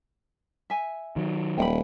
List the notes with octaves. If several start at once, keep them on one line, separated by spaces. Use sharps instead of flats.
E5 G#5
D#3 F#3
D#1 G5 B5